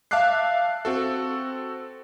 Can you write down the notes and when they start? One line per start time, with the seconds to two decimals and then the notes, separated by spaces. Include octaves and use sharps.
0.11 E5 F5 A5 D6 F#6 C7
0.85 C4 F#4 A4